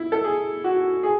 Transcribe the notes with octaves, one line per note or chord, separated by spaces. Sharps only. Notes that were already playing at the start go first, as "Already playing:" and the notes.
Already playing: E4
A4
G#4
F#4
G#4